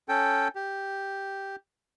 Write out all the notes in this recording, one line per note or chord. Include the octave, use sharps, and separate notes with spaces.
C#4 A4 G5
G4